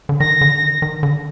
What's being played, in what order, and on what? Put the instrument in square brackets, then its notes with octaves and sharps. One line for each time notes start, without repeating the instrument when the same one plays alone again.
[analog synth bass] D3
[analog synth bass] D#3 [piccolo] A#6
[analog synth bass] D3
D#3
D#3
D3